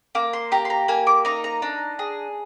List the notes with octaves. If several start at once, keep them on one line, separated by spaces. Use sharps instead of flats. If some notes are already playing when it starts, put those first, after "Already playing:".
A#3 D6
C6
G4 A#5
C6
A#5
A#3 G#5
D6
D#4 A#5
A#5
D4
G#4